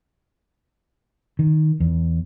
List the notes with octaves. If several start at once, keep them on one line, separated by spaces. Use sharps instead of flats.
D#3
E2